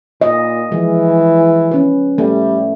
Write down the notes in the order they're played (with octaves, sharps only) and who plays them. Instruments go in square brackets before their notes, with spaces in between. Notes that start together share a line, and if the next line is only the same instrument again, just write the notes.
[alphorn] A#2 [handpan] D#5
[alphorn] E3 [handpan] F3 G#3
[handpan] C#4 B4
[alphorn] G3 [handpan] A3